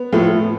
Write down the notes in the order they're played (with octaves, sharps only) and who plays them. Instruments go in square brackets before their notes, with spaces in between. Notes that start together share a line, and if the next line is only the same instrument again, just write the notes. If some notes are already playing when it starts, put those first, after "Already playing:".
Already playing: [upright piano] B3
A2 F3 A3